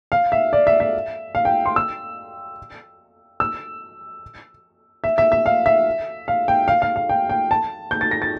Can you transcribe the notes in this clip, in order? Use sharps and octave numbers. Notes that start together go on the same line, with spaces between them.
F5
E5
D5
E5
E5
F5
G5
C6
E6
E6
E5
E5
E5
F5
E5
F5
G5
F5
F5
F5
G5
G5
A5
G6
A6
A#6
A6